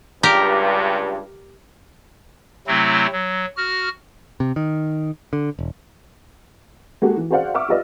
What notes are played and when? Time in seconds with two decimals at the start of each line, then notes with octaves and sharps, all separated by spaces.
0.23 C#2 G2 G4 A#4
2.67 C3 F#3 A3 C4 E4
3.12 F#3
3.57 F#4 F6
4.40 C3
4.56 D#3
5.33 D3
5.59 E1
7.02 G#3 A#3 F#4 G4 A4
7.17 E3
7.30 F#4 G#4 C5 D5 F5 F#5
7.54 E5 F#5 C#6 D6 E6 F6
7.69 F4 G4 B4 D5 D#5 F5